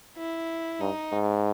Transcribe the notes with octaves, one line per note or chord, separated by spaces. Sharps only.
E4
G2 D#4
G#2